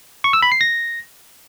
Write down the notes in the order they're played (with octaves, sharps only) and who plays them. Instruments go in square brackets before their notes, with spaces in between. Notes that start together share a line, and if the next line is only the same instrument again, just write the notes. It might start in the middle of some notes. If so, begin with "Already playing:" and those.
[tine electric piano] C#6
E6
B5
C7
A#6